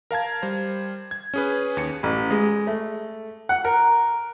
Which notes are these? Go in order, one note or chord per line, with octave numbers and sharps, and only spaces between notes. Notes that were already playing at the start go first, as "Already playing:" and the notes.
A#4 F5 A5 G#6
G3 C5
G#6
C#4 G#4 B4
D#2 C#7
A1
G#3
A3
F#5
A#4